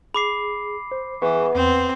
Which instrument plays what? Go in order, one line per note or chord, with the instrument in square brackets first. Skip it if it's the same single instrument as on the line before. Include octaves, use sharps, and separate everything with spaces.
[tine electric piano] G#4 [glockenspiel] B5 D6 C7
[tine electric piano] C5
[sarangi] E3 [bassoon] B3 [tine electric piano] G#4 B4 C#6
[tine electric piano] E2 [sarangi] C4